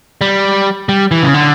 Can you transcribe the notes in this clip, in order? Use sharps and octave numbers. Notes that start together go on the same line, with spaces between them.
G3
G3
E3
C#3
D3